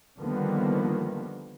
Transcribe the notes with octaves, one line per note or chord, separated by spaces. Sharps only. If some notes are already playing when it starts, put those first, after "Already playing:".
D3 D#3 F3 G3 A#3 B3